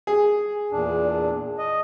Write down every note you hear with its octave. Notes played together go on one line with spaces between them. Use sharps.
G#4
E2 A#2 D4
D#5